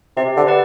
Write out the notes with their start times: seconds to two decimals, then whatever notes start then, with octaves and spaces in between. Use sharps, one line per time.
0.17 C3 G4
0.37 D3
0.47 B4 D5 F#5